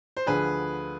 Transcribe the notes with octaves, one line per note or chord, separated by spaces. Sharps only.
C5
D2 D3 F3 G#4 B4